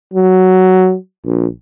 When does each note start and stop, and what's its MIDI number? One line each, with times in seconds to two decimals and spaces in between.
0.14 0.95 54
1.26 1.46 34